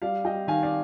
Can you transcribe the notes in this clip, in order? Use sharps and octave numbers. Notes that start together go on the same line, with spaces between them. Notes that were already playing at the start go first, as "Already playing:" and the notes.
G3 D5 F5
G3 D#5 G5
D#3 F5 G#5
D5 F5